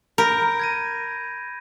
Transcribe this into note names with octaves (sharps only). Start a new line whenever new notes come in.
A#4 B5 G6 D7
G#6 A#6 D#7